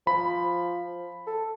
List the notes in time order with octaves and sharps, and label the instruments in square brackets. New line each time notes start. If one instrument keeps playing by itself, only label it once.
[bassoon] F3 [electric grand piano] B5
[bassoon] A4